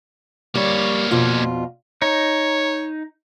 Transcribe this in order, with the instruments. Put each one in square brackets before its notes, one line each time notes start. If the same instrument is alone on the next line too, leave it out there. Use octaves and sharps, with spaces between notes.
[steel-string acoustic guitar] G3 [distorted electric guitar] A#3 C#5
[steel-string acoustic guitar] F2 B2 F4
[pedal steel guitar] D#4 [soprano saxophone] C#5